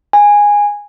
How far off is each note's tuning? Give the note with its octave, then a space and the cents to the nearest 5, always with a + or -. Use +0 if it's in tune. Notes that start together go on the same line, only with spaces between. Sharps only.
G#5 -10